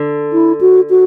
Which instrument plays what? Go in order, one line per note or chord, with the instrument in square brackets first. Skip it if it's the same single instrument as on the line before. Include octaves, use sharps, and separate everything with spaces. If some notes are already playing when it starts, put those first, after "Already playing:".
Already playing: [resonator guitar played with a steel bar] D3
[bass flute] E4
F#4
F#4